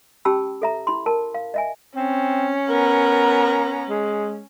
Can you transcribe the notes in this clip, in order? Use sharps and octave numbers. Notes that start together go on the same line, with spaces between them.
C#4 G4 G5 A5 B5 E6
A4 E5 A#5
E4 B5 C6
A#4 A5
F5
D#5 E5 G#5
C4 C#4
B3 A#4 A#5
G#3